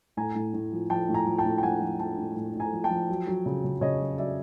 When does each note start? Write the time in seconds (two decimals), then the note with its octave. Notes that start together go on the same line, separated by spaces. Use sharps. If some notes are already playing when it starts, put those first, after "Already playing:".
0.17 A2 G#5 A#5
0.35 A2
0.54 A2
0.72 F3
0.90 F3 G5 A5
1.09 A2
1.14 G#5 A#5
1.27 F3
1.39 G5 A5
1.45 A2
1.58 G5
1.63 F3 F#5 G#5
1.81 F3
1.99 F3 G5 A5
2.18 A2
2.36 A2
2.54 A2
2.60 G#5 A#5
2.73 F3
2.84 G5 A5
2.90 F3
3.09 F#3
3.27 F#3
3.46 C#3
3.64 C#3
3.81 C#3 C#5 D#5
4.00 F#3
4.18 F#3 D5 E5